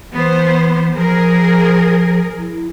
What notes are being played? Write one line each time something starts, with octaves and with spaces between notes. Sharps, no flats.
E3 B3 C5
F3 G#4 A#4
E4